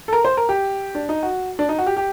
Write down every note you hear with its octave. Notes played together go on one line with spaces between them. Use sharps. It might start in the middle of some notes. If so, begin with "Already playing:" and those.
A4
A#4
C5
A#4
G4
D4
D#4
F#4
D4
D#4
F#4
G4
G4